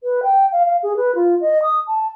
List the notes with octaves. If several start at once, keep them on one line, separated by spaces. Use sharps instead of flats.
B4
G5
F5
F5
G#4
B4
F4
D#5
D#6
A5